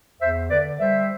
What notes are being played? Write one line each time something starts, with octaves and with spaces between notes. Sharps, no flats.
E2 C5 E5
D3 B4 D5
G3 C5 E5